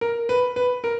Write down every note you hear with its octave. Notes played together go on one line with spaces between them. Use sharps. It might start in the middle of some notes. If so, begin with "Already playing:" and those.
A#4
B4
B4
A#4